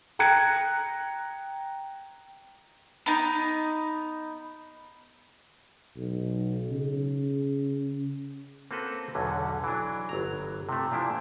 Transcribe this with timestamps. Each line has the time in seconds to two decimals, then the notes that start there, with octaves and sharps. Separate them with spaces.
0.19 G5 A#5 F#6 G#6 C#7
3.06 B3 D#4
5.97 B1
6.70 C#3
8.71 A#3 C4 F#4 A4 B4
9.15 B1 E2 D3 F#3 C#4
9.64 E3 F#3 D4
10.09 G1 F#3 A#5
10.69 C3 A3
10.91 A#2 F3 D4 E4